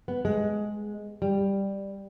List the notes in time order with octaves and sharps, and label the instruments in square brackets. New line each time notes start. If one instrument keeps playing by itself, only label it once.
[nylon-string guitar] B3
G#3
G3